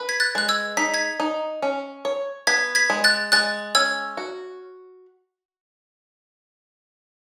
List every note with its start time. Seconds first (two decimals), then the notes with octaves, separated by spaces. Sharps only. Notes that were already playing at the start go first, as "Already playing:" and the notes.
Already playing: B4
0.09 G#6 B6
0.20 F#6 A6
0.35 G#3 F#6
0.49 E6 G#6
0.77 D#4 B6
0.94 G#6 B6
1.20 D#4
1.62 C#4
2.05 C#5
2.47 B3 G#6 B6
2.75 G#6 B6
2.90 G#3
3.04 F#6 A6
3.32 G#3 F#6 A6
3.75 C#4 E6 G#6
4.17 F#4